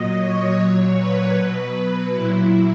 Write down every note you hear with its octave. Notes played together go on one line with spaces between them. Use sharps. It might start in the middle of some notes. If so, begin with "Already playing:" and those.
Already playing: A#2 F#3 D#5
C#5
A#2 F#3
B4
B2 F#3
A#2 F#3 E4